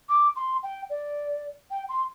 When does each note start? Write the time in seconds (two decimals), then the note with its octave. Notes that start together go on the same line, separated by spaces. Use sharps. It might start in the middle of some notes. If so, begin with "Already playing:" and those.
0.09 D6
0.36 C6
0.63 G5
0.90 D5
1.71 G5
1.89 C6